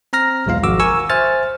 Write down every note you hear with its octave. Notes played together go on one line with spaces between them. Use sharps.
C4 A#5 F6 A#6
B1 E2 G#3 F4 F5
G#1 F3 F#4 D6 E6
A#4 G#5 C#6 E6
C5 E5 G#5 F6 A6